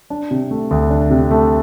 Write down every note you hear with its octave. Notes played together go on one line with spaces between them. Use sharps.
D4
C3
A3
D2
D4
C3
A3